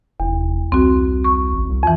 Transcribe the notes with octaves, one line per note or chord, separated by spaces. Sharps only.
F1 E2
C2 C4 F#4
C#6
A1
C2
F2 E3